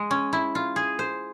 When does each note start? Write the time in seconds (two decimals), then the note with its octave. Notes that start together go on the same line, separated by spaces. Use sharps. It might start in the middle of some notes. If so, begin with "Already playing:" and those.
Already playing: G#3
0.11 C#4
0.33 E4
0.55 F4
0.76 G#4
0.99 C5